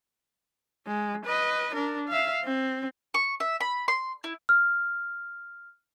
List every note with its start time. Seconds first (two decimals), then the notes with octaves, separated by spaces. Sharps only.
0.87 G#3
1.25 B4 D#5
1.75 D4 A#4
2.08 E5 F5
2.44 C4
3.14 C#6
3.40 E5
3.60 B5
3.88 C6
4.24 E4
4.49 F6